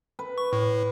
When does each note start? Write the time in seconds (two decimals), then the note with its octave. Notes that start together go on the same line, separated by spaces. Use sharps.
0.19 B4
0.38 C#6
0.53 A2